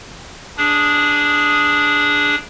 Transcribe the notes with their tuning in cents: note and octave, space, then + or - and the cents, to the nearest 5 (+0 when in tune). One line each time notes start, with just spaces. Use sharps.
D4 -5 G#4 +0 D#6 +0